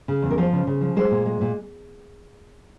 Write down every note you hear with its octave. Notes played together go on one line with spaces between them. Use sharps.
C#3
E2
A#4
F3 C5
C#3
C#3
F3
G#3 C5
A#2
G#3
A#2